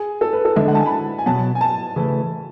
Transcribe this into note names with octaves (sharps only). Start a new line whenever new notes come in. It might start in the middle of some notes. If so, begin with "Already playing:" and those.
Already playing: G#4
A4
B4
A4
D3 G#3 D4 E5
F#5
A5
G#5
B5
A5
G#5
B2 F#3 B3 A5
G#5
A5
C#3 E3 A3